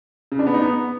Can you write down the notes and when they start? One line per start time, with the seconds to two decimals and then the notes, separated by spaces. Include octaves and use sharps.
0.32 C#3
0.39 D4
0.47 B3
0.54 D#4
0.62 B3